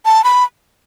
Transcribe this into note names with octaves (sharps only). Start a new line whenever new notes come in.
A5
B5